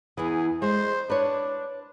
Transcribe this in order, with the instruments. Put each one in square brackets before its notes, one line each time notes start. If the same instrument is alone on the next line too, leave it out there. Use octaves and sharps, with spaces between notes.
[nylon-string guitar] E2 E3 [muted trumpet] G#4
[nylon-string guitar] G#3 [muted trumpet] C5
[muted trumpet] D4 [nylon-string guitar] B4 C#5